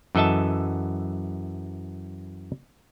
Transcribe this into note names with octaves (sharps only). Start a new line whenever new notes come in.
F#2 E3 A4 D#5 E5 A5